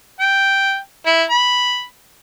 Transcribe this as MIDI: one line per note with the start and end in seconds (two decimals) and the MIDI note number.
0.20 0.77 79
1.06 1.23 64
1.31 1.85 83